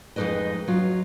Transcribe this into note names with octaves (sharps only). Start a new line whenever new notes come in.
F2 G#3 D#4 G4 B4 D#5
F#3 F4